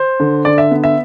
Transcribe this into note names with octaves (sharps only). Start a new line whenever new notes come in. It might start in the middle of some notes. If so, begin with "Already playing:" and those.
Already playing: C5
D3
D3 D5
E5
B3
E5